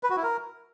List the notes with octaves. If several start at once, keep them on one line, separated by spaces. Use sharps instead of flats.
B4
F#4
E4
A#4